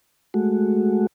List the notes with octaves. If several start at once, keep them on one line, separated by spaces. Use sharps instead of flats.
G#3 A3 F#4